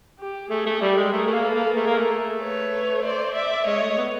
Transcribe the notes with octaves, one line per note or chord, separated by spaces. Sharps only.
G4
A3 G#4
A3
G3 G4 A4
G#3
A3 G#4 A#4
A3
A#3
A4 B4
A#3
A3 G#4 A#4
A#3
A3
B4 C#5
C5 D5
D5 E5
G#3 C#5 D#5
A3
B3